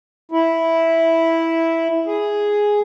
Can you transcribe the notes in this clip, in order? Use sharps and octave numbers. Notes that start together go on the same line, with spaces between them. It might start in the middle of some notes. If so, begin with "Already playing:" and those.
E4
G#4